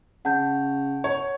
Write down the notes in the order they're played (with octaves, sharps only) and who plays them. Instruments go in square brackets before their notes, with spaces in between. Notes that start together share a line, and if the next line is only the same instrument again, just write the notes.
[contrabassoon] C#3 [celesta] F#5 A5 G6
[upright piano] C#5